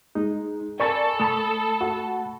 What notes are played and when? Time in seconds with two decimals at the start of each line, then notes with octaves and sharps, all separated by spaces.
0.15 G#3 D#4
0.79 A4 A#4 D5 G#5 B5 C#6 A6
1.20 A3 A5 B5 D#6 E7
1.81 F#4